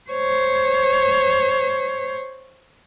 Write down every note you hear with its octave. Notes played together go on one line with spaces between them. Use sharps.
C5 C#5